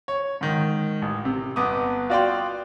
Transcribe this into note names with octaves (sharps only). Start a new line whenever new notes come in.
C#5
G#2 D#3
A1
C3
G1 B3 D6 D#6
F4 F#4 D5 F5 G5 C6